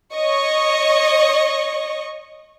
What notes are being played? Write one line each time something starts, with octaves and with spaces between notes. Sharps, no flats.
C#5 D#5 C#6